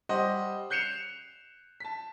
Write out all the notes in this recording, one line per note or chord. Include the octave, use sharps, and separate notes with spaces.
G3 G4 C5 D#5 F#5
F#6 G6 C7 C#7 E7 F7
A5 B6